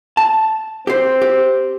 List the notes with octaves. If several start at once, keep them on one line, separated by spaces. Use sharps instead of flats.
A5
C4 G4 C5
G4